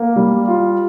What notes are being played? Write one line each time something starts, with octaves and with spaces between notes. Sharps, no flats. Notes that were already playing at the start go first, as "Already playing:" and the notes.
Already playing: A#3
G3
F4